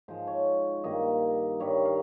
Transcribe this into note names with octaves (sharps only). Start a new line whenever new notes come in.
G#2 F3 G#3 C5
C#5
G2 D#3 A#3 D#5
G2 D#3 G3 C#5
F5